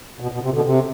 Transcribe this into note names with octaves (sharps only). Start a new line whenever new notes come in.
B2
B2
C3
B2 D3
C3